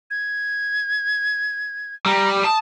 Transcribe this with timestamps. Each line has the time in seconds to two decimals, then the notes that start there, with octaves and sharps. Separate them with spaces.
0.11 G#6
2.06 G3 A#5
2.44 A5 D#6